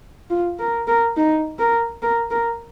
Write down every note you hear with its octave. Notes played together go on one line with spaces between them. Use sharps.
F4
A#4
A#4
D#4
A#4
A#4
A#4